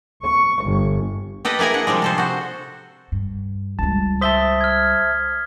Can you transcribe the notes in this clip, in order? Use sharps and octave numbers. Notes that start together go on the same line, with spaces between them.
C#6
G1
G4 A4 B4 D#5
A#3 E4 G#4 A#4 G#5
D4 F#5
C3 F3 G3 G#3
C3 A4 C5
F#4 C5
G2
C#2 G3 A5
C5 E5 A5 D#6 B6 G7
F6 G#6